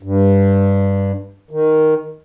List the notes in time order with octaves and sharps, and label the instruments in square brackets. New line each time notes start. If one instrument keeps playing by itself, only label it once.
[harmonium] G2
D#3